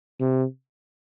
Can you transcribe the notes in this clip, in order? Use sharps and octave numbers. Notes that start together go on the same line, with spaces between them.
C3